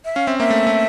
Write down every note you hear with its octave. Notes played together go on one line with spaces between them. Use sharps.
E5
C#4 F5
C4 E5
A#3 E5
A3
A3